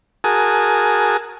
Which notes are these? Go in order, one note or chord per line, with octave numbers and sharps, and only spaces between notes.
F#4 G#4 A#4 G#5 A5 D#6